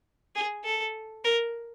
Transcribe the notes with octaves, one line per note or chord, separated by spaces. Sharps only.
G#4
A4
A#4